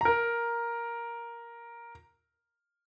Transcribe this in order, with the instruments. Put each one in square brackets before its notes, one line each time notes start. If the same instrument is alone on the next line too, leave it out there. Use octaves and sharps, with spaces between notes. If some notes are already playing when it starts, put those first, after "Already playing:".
[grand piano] A#4 A#5